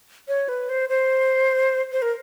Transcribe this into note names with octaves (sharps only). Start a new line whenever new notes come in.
C#5
B4
C5
C5
C5
A#4